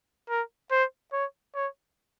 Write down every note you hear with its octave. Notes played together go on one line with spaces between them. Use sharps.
A#4
C5
C#5
C#5